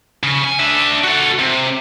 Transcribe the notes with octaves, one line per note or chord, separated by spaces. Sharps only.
C#3
G#5
D4 E5
F#4 A4
C3